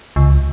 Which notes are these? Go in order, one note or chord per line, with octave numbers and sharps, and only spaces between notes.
C#2